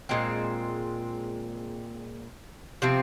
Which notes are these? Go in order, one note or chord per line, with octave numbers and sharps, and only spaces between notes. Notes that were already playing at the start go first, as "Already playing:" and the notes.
A#2 G#3 C4
C3 F3 C4